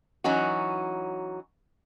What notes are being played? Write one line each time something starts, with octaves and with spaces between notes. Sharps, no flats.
E3 F#3 C#4 D#4 F#4